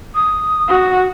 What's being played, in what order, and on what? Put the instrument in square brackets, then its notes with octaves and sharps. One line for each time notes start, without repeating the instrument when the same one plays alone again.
[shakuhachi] D#6
[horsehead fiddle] F#4